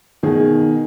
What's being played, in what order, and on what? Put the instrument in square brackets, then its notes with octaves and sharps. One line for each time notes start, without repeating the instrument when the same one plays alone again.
[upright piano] B2 D#3 G#4